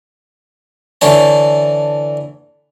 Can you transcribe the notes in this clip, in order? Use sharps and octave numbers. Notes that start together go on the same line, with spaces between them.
D3 E3 C#5 A5